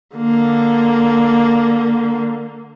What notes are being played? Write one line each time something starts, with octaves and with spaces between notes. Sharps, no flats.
D3 A#3